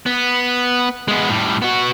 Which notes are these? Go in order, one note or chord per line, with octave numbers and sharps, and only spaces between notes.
B3
G#3 B3
A2 G3
B3 F#4